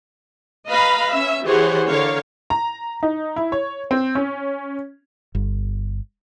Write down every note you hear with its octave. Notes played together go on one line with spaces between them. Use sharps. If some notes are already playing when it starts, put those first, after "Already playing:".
B4 D#5 F5 A#5 B5
C#4 E5
E3 G4 G#4 C5 C#5 F#5
D3 A#4 C#5 F5
A#5
D#4
E4
C#5
C4
C#4
G1